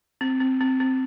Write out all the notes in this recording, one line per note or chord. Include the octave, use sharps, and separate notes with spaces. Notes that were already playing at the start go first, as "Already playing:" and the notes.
C4
C4
C4
C4